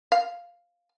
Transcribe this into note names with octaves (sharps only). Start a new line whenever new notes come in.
F5